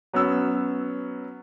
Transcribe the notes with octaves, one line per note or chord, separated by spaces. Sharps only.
F#3 B3 C#4 E6